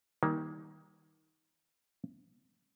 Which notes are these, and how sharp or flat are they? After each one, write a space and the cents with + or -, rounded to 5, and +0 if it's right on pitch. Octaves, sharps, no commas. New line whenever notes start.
D#3 +25 G3 +0 A#3 +20